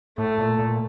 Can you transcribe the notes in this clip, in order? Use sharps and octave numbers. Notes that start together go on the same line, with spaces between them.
A2 A3
A#2
A#2